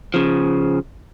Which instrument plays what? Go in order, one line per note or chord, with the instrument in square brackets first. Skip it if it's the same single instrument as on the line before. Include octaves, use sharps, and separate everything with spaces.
[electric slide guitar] C#3 F3